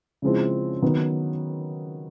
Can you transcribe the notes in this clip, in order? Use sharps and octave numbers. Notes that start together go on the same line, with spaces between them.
C#3 F3 G#3 C4 E4
D#3 F#3 B3